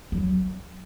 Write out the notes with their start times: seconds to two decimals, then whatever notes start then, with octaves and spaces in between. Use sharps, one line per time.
0.12 F#3